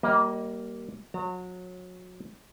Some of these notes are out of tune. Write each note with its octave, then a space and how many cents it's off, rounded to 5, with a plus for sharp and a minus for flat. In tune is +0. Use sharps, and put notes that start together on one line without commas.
G3 -25 A#3 +0 D#5 +20
F#3 -25 A#5 -35